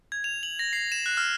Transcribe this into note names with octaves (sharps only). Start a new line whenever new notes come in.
G#6
F7
F#7
A#6
C7
E7
F#6
F6